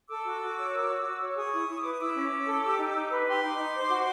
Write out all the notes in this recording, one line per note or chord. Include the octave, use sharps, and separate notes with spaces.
A4 D6 E6
F#4
F#4
C#5
A#4
F#4
F#4
C#5
E6
G#4 C#6 D#6
E4
E4 C#6
B4 D6
D#6
E4 D6 E6
C#4
C#4
A4
G4
D#4
D#4
B4
G4 C6 D6
D#4
D#4
C5
F#4